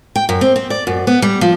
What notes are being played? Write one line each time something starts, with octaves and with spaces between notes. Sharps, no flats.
G5
F#2
C4
C4
D5
F#2
B3
G3
F3